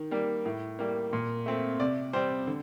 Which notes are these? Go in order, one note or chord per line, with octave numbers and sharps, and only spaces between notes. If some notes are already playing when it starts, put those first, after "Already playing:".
Already playing: D#3
G3 A#3
A2
G3 A#3
A#2
A3 C4
C3 D5
G3 C4 C5
D3